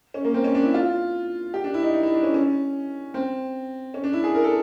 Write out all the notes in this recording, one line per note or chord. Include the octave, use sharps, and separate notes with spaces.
C#4
A#3
C4
C#4
D4
E4
F4
G4
D4
E4
D#4
D#4
E4
D4
C#4
C#4
C4
C#4
D4
E4
G#4
A#4
A4